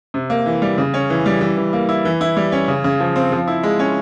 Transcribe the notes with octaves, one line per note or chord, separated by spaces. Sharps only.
C3
A#3
E3
G3
C#3
C#4
E3
G3
E3
E3
A#3
E4
E3
E4
G3
C#4
C#3
C#3
F3
C4
F3
E4
G#3
C#4